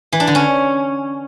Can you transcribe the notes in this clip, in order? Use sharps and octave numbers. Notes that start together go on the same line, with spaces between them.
E3
D4
D3
C#4